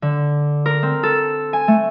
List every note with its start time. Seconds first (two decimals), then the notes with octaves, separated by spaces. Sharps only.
0.02 D3
0.66 A#4
0.83 C4
1.03 A4
1.53 G#5
1.68 A3